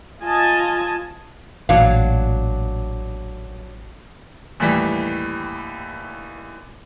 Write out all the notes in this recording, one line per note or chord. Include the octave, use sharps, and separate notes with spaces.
F4 D#5 G#5 A5
A1 A#2 F#3 D4 F5
D#2 A2 E3 G3